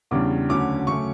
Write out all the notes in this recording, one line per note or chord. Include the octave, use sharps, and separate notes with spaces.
E2 C#3 G3 D4 D6
D2 D3 F#3 C#4 D6
C#3 F#3 A3 C#4 C#6